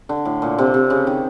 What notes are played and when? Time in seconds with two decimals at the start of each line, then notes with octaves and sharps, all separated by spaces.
0.09 D3
0.25 A2
0.42 A#2
0.58 C3
0.74 C3
0.90 C#3
1.07 D#3